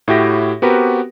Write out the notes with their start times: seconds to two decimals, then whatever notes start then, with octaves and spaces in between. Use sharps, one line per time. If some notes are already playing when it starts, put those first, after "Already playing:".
0.08 A2 E4 F#4 G4 G5 A#6
0.62 B3 C4 F#4 G4 A#4 B4